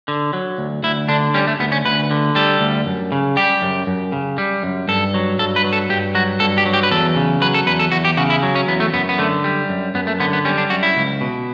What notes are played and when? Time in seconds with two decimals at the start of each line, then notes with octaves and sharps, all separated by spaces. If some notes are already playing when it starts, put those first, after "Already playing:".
0.08 D3
0.33 F#3
0.58 D2
0.83 D2 E4
1.09 D3 D4
1.34 G3 C#4
1.47 A3
1.60 D2 B3
1.72 C#4
1.85 D2 B4
2.11 D3
2.35 G3 A4
2.61 D2
2.86 F#2
3.12 C#3
3.36 G3 G4
3.62 F#2
3.87 F#2
4.12 C#3
4.38 G3
4.63 F#2
4.88 G2 A4
5.14 F#3
5.39 G2 A4
5.56 B4
5.65 F#3
5.73 A4
5.89 G2 G4
6.15 F#3 F#4
6.40 G2 A4
6.58 G4
6.66 F#3
6.73 G4
6.83 B4
6.91 E2 A4
7.16 C#3
7.42 F#3 B4
7.54 A4
7.67 E2 B4
7.79 A4
7.92 E2 F#4
8.05 G4
8.17 C#3 F#4
8.30 E4
8.43 F#3
8.55 C#4
8.68 E2 B3
8.80 A3
8.93 F#2 B3
9.09 B3
9.18 D3 A3
9.44 G3
9.69 F#2
9.95 F#2 B3
10.07 A3
10.20 D3 B3
10.33 B3
10.45 G3 C#4
10.58 D4
10.70 F#2 F#4
10.83 E4
10.96 C#2
11.21 B2